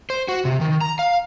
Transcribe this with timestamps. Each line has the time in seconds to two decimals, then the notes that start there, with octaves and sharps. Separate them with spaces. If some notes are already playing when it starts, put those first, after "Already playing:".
0.10 C5
0.28 F#4
0.45 C3
0.61 D#3
0.81 A#5
0.99 F5